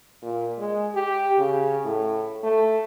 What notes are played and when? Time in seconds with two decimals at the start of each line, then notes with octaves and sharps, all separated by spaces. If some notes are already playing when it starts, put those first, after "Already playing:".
0.23 A#2
0.59 G#3
0.96 G4
1.39 C#3
1.85 A2
2.44 A3